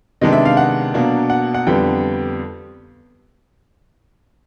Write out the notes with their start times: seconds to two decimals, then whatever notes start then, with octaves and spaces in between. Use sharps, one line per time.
0.21 C3 D#3 G#3 B3 D4 D#5
0.32 E5
0.45 F5
0.57 F#5
0.94 B2 F#3 A#3 D4
1.30 F#5
1.54 F#5
1.66 F2 D3 G3 B3 G5